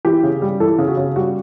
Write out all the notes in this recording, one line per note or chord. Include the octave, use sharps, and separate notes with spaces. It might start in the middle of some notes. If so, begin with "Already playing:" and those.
E3 G4
C#3
G3
E3 A4
C#3
F#4
C#3
G3 F#4